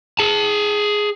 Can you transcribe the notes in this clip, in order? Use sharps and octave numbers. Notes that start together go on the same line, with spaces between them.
G#4 A5